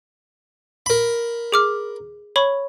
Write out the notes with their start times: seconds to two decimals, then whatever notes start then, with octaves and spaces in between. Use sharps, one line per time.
0.86 A#4 B5
1.52 G#4 D6 F6
2.36 C#5 B5 C#6